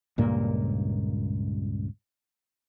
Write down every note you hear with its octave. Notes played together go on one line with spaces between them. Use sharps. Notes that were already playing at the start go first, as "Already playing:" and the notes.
C#2 G2 A#2 A#3